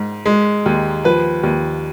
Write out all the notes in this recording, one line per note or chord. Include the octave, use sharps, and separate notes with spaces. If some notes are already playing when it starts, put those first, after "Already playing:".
Already playing: G#2
G#3
D#2
F3 B4
D#2